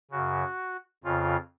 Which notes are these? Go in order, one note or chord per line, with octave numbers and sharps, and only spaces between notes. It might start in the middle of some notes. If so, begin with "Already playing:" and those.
F#2 C#3 F#4
F2 C#3 F4